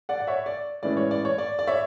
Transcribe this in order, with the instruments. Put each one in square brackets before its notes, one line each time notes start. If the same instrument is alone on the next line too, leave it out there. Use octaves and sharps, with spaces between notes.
[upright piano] D5 F#5
F#5
C#5 E5
D5
A2 E3 G#3 C#4 D5
C#5
D5
C#5
D5
D5
C#5 E5